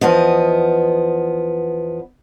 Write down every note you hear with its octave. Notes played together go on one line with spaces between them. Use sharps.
E2 F3 B3 D#5